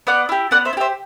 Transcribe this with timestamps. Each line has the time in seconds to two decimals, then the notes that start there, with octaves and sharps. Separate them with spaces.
0.07 B3 D5 F#5
0.29 E4 G4
0.51 B3 D5 F#5
0.65 C5 E5
0.73 E4
0.77 G4 C5 E5